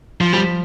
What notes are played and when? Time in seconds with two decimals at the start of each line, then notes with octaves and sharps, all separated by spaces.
0.21 F3
0.33 F3 G3